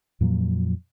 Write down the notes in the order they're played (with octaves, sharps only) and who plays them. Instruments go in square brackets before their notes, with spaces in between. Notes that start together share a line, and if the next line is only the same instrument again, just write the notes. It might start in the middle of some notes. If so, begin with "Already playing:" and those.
[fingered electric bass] F2 A#2 F3 F#3